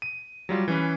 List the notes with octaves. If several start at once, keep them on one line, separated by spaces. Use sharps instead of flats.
D#7
F#3 G3 F4
E3 C#4 B4